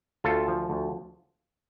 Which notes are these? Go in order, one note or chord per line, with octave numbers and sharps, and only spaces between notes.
D2 F4 A4
F3
D2